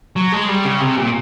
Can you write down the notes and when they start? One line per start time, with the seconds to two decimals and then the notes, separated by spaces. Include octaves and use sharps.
0.16 F#3
0.32 G#3
0.48 G3
0.65 C#3
0.80 C3
0.97 A#2